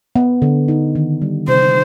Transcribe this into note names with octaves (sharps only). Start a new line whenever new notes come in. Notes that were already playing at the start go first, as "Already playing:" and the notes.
B3
D3
D#4
D#3
G3
C3 C5